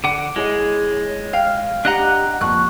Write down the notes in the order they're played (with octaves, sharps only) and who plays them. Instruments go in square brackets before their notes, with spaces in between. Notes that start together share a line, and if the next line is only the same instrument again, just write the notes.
[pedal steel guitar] D3 F#5 [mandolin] D6
[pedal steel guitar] G#3 [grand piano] E4 G#4 D#5 [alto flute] C#5
[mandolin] F5 [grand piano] G5
[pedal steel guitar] D4 D#5 A#5 [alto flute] G4 [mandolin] F#5 F#6
[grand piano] F2 A#2 [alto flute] C#6 [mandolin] F#6